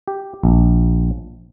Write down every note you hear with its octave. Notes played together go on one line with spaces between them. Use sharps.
G4
A#1